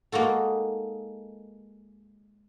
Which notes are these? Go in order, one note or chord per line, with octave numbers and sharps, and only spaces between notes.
G#3 A#3 D#4 F#4 A4